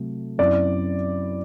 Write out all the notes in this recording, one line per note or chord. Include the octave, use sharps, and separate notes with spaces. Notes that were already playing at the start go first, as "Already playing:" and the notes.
Already playing: C3 F#3 A3
F#2 F#3 C4 E4 D5